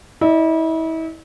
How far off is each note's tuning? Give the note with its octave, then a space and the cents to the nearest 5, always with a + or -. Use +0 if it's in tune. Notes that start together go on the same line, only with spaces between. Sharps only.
E4 -35 D5 +40